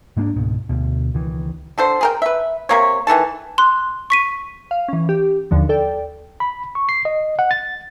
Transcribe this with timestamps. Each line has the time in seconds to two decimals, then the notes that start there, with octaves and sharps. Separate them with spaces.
0.17 G#2 G#3 A#3 D4
0.36 C#2 G#2 B2
0.69 D2 B2
1.14 C#2 D#3 E3
1.78 D3 A4 C5
2.01 G#4 A#4 G5
2.22 B4 E5
2.69 C3 A#3 C#5
3.07 D#3 E3 A4 A5
3.58 C6 F#6
4.10 C#6 B6 D#7
4.71 F5
4.88 E3 C#4
5.09 G4
5.51 D#2 D3 F3
5.69 A4 D5 G5
6.40 B5
6.75 C#6
6.89 C7
7.05 D#5
7.39 F#5
7.51 A6